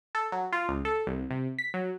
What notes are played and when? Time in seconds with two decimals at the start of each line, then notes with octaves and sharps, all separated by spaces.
0.15 A4
0.32 F#3
0.53 F4
0.69 C#2
0.85 A4
1.07 C2
1.31 C3
1.59 B6
1.74 F#3